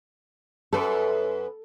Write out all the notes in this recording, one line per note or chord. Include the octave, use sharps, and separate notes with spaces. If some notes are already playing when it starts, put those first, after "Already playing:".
F#2 A4 B4